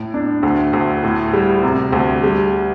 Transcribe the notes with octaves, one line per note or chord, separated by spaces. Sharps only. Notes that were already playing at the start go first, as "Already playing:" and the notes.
Already playing: A2
D4
D2
D2
A2
G3
C3
D2
G3